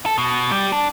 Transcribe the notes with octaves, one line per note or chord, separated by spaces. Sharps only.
A4
B2
G3
D4